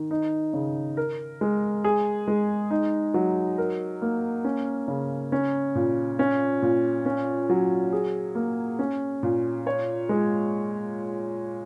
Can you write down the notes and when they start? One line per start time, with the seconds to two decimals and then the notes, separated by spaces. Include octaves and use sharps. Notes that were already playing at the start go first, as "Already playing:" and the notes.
Already playing: D#3
0.11 D#4
0.53 C#3
0.97 A#4
1.41 G#3
1.84 G#4
2.28 G#3
2.71 D#4
3.14 F#3
3.58 A#4
4.02 A#3
4.44 C#4
4.88 C#3
5.32 C#4
5.75 A#2
6.19 C#4
6.62 A#2
7.06 C#4
7.49 F#3
7.92 G#4
8.35 A#3
8.79 C#4
9.23 A#2
9.67 C#5
10.09 G#3